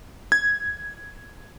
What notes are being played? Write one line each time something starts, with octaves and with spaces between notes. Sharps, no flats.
G#6